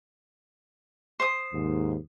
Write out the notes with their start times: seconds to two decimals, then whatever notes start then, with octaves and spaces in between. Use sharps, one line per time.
1.20 C5 D#6
1.54 D#2 G#2